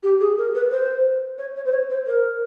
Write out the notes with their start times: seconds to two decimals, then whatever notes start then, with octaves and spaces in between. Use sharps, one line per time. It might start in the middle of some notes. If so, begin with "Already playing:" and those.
0.03 G4
0.20 G#4
0.38 A#4
0.55 B4
0.71 C5
1.38 C#5
1.56 C#5
1.65 C5
1.72 C#5
1.90 C5
2.07 A#4